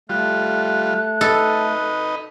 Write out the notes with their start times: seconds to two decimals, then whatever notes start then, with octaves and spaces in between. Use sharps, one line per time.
0.09 G3 A3 F4 F#6
1.21 D#4 A4 B4 D#5